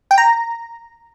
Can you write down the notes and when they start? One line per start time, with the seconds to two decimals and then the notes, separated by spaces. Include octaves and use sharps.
0.11 G5
0.18 A#5